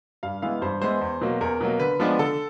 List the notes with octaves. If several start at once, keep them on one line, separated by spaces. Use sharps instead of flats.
G2 F5
E3 G#3 B3 E4 F5
G2 C5
E3 G#3 B3 E4 C5
E2
B2 F#3 A#3
E2 A#4
B2 F#3 A#3
D3 B4
F3 G#3 B3 D4
D3 A4